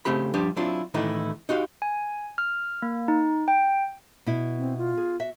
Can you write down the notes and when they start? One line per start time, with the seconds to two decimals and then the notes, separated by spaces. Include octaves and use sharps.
0.05 C#3 A3 C4 G4 B5
0.34 F3 G3 D4 G4 B4
0.56 F#3 C4 D4 E4 F4
0.94 A2 D#3 E3 A3 D#4 E4
1.49 D#4 F#4 G4 F5
1.82 G#5
2.38 F6
2.82 A#3
3.08 D#4
3.48 G5
4.26 B2 E4
4.58 C4
4.78 F4
4.97 G#4
5.20 F#4 E5